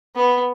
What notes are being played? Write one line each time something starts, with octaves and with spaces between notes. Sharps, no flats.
B3